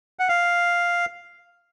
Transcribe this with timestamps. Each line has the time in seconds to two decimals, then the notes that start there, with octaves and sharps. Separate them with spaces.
0.19 F#5
0.29 F5